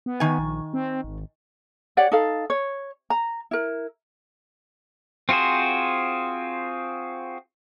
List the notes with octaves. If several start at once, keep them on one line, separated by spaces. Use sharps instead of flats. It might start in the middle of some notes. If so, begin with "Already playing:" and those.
B3
D#3 G#5
A#1
C4
G#1
G4 C#5 D5 F#5
D#4 A4 F5
C#5
A#5
E4 A#4
C4 F4 F#4 G#4 C5